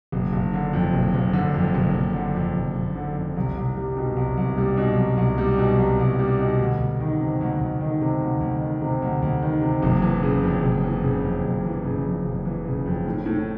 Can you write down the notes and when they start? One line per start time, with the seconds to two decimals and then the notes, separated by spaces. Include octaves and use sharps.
0.12 F#1
0.33 F#1
0.53 D3
0.73 F2
0.94 F#1
1.14 F#1
1.33 D3
1.54 F2
1.74 F#1
1.94 F#1
2.15 D3
2.35 F2
2.55 F#1
2.75 F#1
2.95 D3
3.16 F2
3.36 C2
3.57 C2
3.77 G3
3.97 B2
4.16 C2
4.37 C2
4.57 G3
4.77 B2
4.98 C2
5.17 C2
5.38 G3
5.58 B2
5.79 C2
5.99 C2
6.19 G3
6.39 B2
6.59 D2
6.79 D2
7.00 D#3
7.19 C3
7.41 D2
7.60 D2
7.81 D#3
8.01 C3
8.21 D2
8.41 D2
8.61 D#3
8.81 C3
9.02 D2
9.22 D2
9.42 D#3
9.62 C3
9.82 F#1
10.02 E3
10.23 C#3
10.43 F2
10.63 F#1
10.83 E3
11.03 C#3
11.24 F2
11.45 F#1
11.64 E3
11.85 C#3
12.05 F2
12.25 F#1
12.45 E3
12.66 C#3
12.86 F2
13.06 A2
13.26 A2